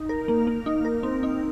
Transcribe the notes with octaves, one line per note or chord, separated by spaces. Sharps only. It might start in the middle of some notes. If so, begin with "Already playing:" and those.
Already playing: D#4
A#4
A#3
A#3
D#4
A#4
C4
D#4